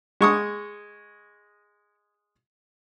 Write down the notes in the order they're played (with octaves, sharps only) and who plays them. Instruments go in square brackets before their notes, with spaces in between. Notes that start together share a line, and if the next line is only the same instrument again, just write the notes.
[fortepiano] G#3 C#6 D#6